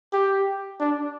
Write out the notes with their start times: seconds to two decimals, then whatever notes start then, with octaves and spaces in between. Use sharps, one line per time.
0.13 G4
0.80 D4